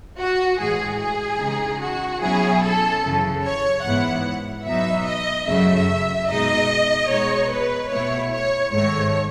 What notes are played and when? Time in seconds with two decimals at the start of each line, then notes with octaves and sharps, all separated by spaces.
0.19 F#4
0.59 A2 E3 G#3 G#4
1.00 G#4
1.40 C#3 E3 G#3 D#4
1.81 F#4
2.22 B2 F#3 C#4 E4 G#4
2.62 A4
3.03 F#2 C#3 E3
3.44 C#5
3.84 G#2 E3 B3 E4 F#5
4.66 B2 F#3 B3 D#4 E5
5.06 D#5
5.47 F#2 C#3 F#3 A3 E5
6.28 B2 G#3 D#4 D#5
7.10 B2 G#3 B3 D#4 C#5
7.51 B4
7.91 B2 A3 E4 C#5
8.32 C#5
8.72 G#2 D#3 A3 C#5